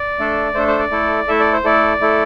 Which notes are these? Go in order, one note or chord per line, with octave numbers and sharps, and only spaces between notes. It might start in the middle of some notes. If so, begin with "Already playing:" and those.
Already playing: D5
A3 D4 A4
A3 D4 A4 C5
C5
D5
A3 E4 A4
A3 E4 A4 E5
D5
C5
A3 E4 A4 D5
A3 E4 A4